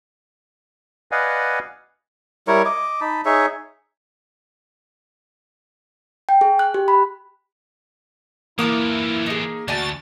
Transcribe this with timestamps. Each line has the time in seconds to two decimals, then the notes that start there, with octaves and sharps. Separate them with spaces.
1.12 B4 D5 D#5 F5 F#5 G#5
2.48 G3 E4 A#4 C#5
2.65 D#5 D6
3.01 D#4 A5 B5
3.25 D#4 G#4 C#5 E5
6.29 G5
6.41 G#4
6.59 F#6
6.74 G4
6.88 B5
8.59 E3 A#3 E4 F4 A5 D6 D#6
9.26 D#4 G#4
9.68 D2 F#4 D5 G#5 A5 A6